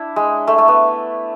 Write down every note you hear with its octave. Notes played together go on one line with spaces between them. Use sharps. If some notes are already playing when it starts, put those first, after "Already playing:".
Already playing: D4 E4
G#3
A3
A3
B3